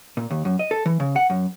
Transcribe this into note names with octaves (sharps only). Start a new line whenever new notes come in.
A#2
D#2
F#2
D#5
A4
E3
C#3
F#5
F#2